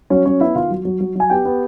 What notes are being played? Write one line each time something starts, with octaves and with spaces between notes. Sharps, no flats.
F#3 C#4 C#5
F#3 C#4 C#5
B3 E4 E5
D#3 F4 F5
F#3
F#3
F#3
F#3 G#5
B3 G4 G5
B3